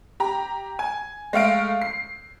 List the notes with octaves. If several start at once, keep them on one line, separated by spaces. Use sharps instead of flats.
G4 A#5
G#5
G#3 A3 F5 D7
C7